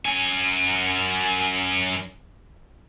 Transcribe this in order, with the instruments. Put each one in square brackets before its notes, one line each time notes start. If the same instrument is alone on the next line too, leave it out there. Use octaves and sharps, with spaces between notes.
[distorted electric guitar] F#2 G#5